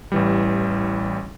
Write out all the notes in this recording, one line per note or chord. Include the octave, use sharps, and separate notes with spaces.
A1 E3 G3